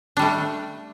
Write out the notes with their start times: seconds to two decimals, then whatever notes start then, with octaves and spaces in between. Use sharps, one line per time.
0.17 D4
0.19 G3
0.22 A3